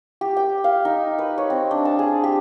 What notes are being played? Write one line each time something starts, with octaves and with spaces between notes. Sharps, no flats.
G4
G5
F5
D#4
B4
C#5
C4
D4
A5
G#4
G4